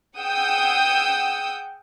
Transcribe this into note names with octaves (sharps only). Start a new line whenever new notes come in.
G#4 F#5 G5 D#6 E6 G6